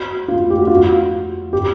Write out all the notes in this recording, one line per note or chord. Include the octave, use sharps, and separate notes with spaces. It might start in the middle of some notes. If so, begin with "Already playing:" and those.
Already playing: F#4
F4
G4
F#4
F4
F#4
G4